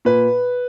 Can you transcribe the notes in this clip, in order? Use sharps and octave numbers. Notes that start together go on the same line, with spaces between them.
A#2 B4